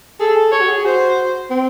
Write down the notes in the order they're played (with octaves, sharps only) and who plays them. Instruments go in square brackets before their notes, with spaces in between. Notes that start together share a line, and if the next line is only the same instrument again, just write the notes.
[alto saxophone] G#4 [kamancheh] A4
[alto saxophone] A4
[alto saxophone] A4 [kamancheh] C#5
[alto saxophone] F#4
G#4
[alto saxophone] F#4 [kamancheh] C5
[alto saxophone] C4